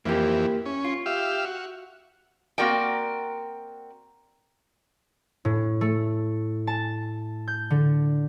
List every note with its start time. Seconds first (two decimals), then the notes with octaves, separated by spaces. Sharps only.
0.05 F2 E3 A#3 E4 G4
0.66 C#4
0.84 F4
1.06 G4 E5 F5
1.45 F#4
2.58 A#3 C4 F#4 A#4 D5 G5
5.45 A2
5.81 A3
6.67 A5
7.48 G6
7.70 D3